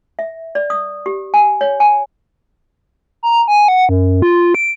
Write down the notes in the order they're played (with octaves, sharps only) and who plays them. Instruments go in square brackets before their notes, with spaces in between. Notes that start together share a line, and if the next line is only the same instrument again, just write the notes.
[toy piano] E5
D5
D#6
G4
G#5
C#5
G#5
[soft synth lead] A#5
G#5
F#5
F#2
F4
D7